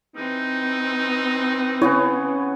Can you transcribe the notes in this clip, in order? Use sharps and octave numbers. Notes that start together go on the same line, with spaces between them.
E3 C4 D#4
C#3 B3 E4 C#5